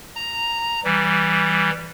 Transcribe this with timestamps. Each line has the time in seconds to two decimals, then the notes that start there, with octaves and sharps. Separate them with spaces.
0.16 A#5
0.84 E3 G3